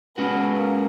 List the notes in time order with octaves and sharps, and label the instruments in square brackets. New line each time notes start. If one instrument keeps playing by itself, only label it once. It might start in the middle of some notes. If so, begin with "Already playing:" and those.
[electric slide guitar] G#3 C#4 F#4 [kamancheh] B3
[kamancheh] A#3